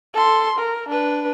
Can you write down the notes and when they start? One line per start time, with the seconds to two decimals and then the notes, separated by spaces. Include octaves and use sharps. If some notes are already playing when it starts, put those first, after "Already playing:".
0.14 A4 C6
0.58 A#4
0.89 D4 B4